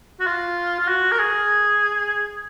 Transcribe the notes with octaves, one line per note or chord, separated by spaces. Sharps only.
F#4
F4
F4
F#4
A#4
G#4